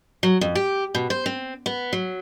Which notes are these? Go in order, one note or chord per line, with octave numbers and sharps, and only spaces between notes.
F#3
F2
G4
B2
C5
C4
B3
F#3